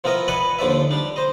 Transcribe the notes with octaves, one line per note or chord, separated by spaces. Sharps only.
F3 B3 E4 A#4 D#5
B4 D5 D#5 F#5 G#5 B5
D#2 D3 F3 D5 E5
G3 D4
C5 D#5